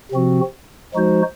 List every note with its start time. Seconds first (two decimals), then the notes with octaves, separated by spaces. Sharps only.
0.12 C3 F3 C4 F#4
0.94 F3 G#3 D#4 F#4 C5